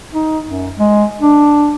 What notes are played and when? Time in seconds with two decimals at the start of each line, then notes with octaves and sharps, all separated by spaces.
0.12 D#4
0.47 F#2
0.79 G#3
1.21 D4